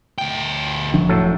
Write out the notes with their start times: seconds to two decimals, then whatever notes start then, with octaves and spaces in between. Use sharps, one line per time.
0.18 D2 G5
0.94 E1 F3 D4
1.09 A2 F#3 A4